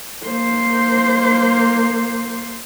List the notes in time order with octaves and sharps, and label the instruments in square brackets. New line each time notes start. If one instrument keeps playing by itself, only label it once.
[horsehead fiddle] A#3 C5